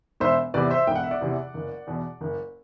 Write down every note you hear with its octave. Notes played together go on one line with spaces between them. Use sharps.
E1 C5 E5
E2 C3 E3 B4 D5
C5 E5
E1 G5
F#5
E5
D5 F#5
E2 C3 E3
F#1
E2 B2
F#1